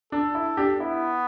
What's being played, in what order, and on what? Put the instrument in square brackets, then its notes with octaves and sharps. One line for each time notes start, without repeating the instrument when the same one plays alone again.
[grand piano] D4 [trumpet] A4
[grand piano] E4
D4 G4
[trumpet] B3 [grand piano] E4